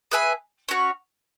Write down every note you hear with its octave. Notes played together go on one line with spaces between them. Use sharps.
G#4 B4 E5 G#5
C#4 F#4 C#5